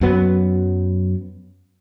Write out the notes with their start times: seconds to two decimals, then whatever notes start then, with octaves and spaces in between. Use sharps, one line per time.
0.01 F#2 F#3 B3